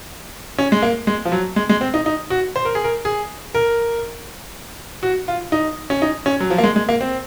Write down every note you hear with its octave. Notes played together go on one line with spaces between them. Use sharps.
C#4
G#3
A#3
G#3
F3
F#3
G#3
G#3
C4
D#4
D#4
F#4
C5
A#4
G#4
A#4
G#4
A#4
F#4
F4
D#4
C#4
D#4
C#4
F#3
F3
A#3
G#3
G#3
A#3
C4